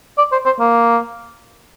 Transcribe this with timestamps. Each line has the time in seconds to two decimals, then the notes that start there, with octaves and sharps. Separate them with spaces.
0.18 D5
0.32 C5
0.46 C5
0.60 A#3